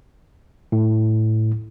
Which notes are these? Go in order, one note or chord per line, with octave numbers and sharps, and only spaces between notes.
A2